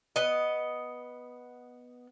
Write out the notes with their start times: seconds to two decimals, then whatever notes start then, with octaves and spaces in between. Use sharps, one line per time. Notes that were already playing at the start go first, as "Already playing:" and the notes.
0.16 B3 D#5